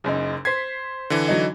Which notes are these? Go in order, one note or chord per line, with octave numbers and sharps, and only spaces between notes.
F#1 F#2 D#4
C5 G#6 B6 C7
D3 E3
F#3 D#4